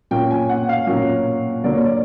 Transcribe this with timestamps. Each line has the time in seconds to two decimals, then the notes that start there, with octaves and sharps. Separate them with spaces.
0.11 A#2 F#3 A#3 C#4 G5
0.31 G#5
0.49 F#5
0.69 F5
0.87 A#2 F#3 A#3 C#4
1.64 D3 F#3 A#3 D5
1.74 C#5
1.85 D5